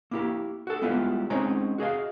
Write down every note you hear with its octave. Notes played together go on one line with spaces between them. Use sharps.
A#3 E4 G4
F#4 A4
G3 G#3 B3 E4 F4
G#3 C4 C#4 D#4 C#5 A#5
F#4 G#4 D#5 F5